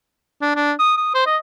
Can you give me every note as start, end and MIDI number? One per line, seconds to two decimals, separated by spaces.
0.42 0.54 62
0.56 0.72 62
0.79 0.93 87
0.97 1.10 87
1.15 1.24 72
1.26 1.37 75